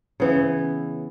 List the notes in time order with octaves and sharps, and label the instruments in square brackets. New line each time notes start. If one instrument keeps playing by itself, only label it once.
[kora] C#3 E3 B3 E4